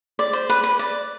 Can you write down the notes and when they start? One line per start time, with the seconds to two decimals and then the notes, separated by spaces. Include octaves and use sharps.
0.19 D5
0.33 C5
0.49 B4
0.64 B4
0.79 D5